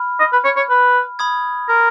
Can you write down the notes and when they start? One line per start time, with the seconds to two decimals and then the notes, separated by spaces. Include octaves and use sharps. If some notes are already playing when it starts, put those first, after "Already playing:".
Already playing: B5 F6
0.20 D#5
0.33 B4
0.44 C#5
0.56 C#5
0.70 B4
1.19 B5 D#6 G#6
1.69 A#4